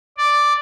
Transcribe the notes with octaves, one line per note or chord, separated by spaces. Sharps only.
D5